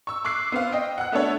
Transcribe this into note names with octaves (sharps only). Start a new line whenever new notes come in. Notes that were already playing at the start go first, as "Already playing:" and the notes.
C#6 E6
C#6 D6 F#6 C7
B3 C5 F5
D#5 G5
F#5 F#6
A3 B3 D4 A4 C#5